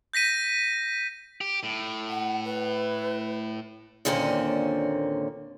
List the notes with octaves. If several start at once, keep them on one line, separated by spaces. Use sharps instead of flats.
G6 A#6 B6 D#7
G4
A2
F#5
B4
D#2 A#2 D3 C4 C#4